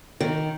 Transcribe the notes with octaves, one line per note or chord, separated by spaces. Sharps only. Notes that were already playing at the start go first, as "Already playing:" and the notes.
D#3